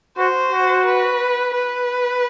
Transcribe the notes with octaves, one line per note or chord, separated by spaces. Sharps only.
F#4 C5
F#4
B4
B4